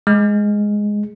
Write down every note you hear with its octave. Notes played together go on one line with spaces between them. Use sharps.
G#3